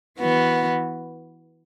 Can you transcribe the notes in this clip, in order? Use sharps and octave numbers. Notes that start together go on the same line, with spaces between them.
E3 B3 F#4